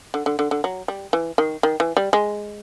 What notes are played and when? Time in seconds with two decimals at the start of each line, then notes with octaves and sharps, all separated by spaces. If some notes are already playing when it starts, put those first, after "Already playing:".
0.14 D3
0.26 D3
0.39 D3
0.51 D3
0.64 F#3
0.88 G3
1.13 E3
1.38 D#3
1.63 D#3
1.80 E3
1.97 G3
2.13 G#3